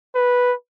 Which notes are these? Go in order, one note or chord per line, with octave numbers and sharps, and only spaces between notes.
B4